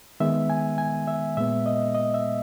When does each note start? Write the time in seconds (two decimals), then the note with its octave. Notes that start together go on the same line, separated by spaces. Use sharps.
0.20 D#3 G#3 B3 E5
0.50 G#5
0.78 G#5
1.08 E5
1.37 A#2 G#3 B3 E5
1.66 D#5
1.95 D#5
2.14 E5